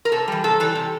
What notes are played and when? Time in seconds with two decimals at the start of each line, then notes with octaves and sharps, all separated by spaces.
0.05 A#4
0.12 C3 A4
0.28 E3 G3
0.44 C3 A4
0.60 E3 G3 A4
0.75 C3